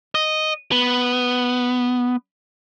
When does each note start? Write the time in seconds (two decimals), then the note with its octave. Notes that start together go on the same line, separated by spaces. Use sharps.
0.15 D#5
0.72 B3